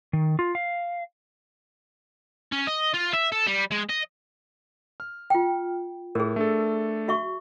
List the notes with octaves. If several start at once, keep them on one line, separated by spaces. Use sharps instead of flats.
D#3
F4
F5
C#4
D#5
F4
E5
A4
G3
G#3
D#5
F6
F4 G5
A2 G#4 A#4
A3 D4 A4
F#4 E5 C#6